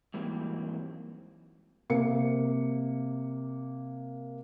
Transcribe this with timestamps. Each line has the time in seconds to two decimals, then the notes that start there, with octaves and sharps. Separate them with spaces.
0.14 G#2 E3 F#3 G3 A#3 C4
1.90 C3 A#3 C#7